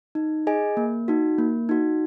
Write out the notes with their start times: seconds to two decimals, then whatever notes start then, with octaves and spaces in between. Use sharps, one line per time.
0.15 D#4
0.47 G#4 D#5 G#5
0.77 A#3
1.08 D#4 F#4
1.38 A#3
1.69 D#4 F#4